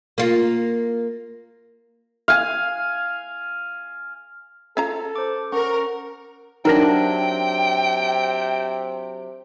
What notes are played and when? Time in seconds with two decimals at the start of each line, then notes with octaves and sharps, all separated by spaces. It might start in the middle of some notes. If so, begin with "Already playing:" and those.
0.18 A#3 F4
2.28 F5 G#5
4.77 C#4 F4 A4 A#5
5.16 C5 D6
5.52 C#4 A#4 F#5 C#6
6.65 C3 F#3 D4 D#4 A#4 G5 A#6